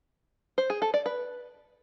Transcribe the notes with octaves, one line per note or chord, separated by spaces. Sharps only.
C5
G#4
A4
D5
B4